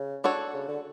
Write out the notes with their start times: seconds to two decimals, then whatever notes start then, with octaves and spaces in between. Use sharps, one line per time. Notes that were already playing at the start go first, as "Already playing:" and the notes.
Already playing: C#3
0.24 D4 F#4 A4 C#5
0.54 C#3
0.69 D3